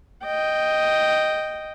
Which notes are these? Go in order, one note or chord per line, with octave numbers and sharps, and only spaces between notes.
D#5 G5